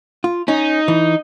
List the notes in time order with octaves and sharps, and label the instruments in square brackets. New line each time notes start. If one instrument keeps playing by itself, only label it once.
[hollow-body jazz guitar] F4
[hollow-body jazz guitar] C#4 [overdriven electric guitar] D#4
[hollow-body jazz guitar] E3